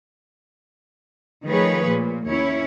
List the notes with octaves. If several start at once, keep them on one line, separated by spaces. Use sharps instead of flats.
D#3 F3 A3 G#4 B4 C#5
A#2
D#2 C#4 E4 C#5